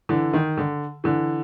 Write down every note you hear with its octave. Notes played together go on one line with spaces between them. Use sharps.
D3 E3
D#3
D3
D3 E3